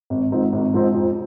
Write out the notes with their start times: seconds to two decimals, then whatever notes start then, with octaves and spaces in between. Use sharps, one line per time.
0.10 G#1
0.32 G#2 F3 C4 D#4
0.53 G#1
0.74 G#2 F3 C4 D#4
0.95 F2